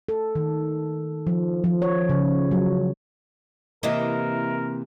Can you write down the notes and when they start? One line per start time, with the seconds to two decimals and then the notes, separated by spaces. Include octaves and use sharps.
0.09 A4
0.35 D#3
1.27 F3
1.64 F3
1.82 C#5
2.09 C#3
2.51 F#3
3.83 C3 E3 A#3 E4 A#4 D#5